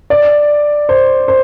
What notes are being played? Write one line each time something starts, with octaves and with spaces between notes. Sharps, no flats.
D5
C5
C5